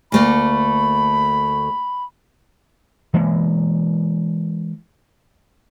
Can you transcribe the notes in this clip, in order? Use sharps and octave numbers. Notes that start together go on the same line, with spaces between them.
D2 A3 A#3 B5
E3 G#3 A#3